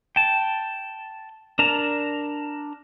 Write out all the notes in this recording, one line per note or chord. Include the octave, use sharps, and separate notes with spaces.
G5 A5
D4 A#4 A5 A#5